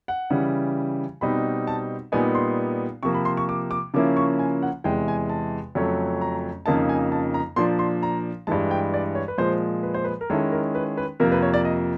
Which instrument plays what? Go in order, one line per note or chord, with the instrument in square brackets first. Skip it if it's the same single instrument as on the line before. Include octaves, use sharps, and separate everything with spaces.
[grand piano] F#5
C#3 E3 G3
B2 G3 C4 D#4 B5
A5
A#2 G3 B3 D#4 G#5
C6
C3 F3 A#3 C#6
B5
C6
C#6
D6
D6
C#3 F3 A#3 C#4 E4 D6
C#6
G#5
F#5
E2 C3 E3 G#3 G5
G#5
A5
F2 C#3 F#3 A3 C#4
A#5
F2 C#3 F3 A#3 D#4 A5
G#5
A5
A#5
A#2 F3 A#3 D4 C6
C6
A#5
G2 E3 G#3 A5
G5
D5
C#5
B4
A#2 F3 G#3 C5
B4
C5
B4
A#4
D#3 G#3 C#4 E4 A4
A#4
B4
B4
F2 C3 F3 A#3 A#4
B4
C#5
D5
D#5